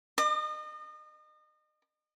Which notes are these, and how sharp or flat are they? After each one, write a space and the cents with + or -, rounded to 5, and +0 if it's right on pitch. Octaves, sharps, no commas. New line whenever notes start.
D#5 -35 D6 +45